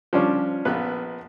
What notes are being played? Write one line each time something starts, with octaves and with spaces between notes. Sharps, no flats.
F3 G3 C#4 D4
A#1 B3 B4